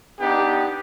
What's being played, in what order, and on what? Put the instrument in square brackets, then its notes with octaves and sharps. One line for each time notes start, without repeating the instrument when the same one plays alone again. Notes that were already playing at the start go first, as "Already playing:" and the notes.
[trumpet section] B3 D4 D#4 G4